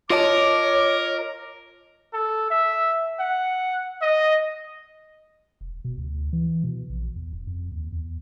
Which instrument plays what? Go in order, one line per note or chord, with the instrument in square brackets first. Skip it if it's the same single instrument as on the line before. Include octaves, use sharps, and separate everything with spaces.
[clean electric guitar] F4 D#5 A5 [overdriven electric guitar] A#4 [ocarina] C#5 [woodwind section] D6
[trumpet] A4
E5
F#5
D#5
[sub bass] E1
B2
D2
E3
B2
A#1
E2
D#1
F2
D#2
E2